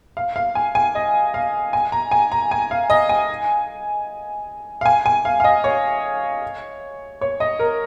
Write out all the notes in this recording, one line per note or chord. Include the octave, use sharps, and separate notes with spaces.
F5
F5
G#5
G#5
D#5
F5
G#5
A#5
G#5
A#5
G#5
F5
D#5
G#5
F5
G#5
G#5
F5
F5
D#5
C#5
C#5
D#5
A#4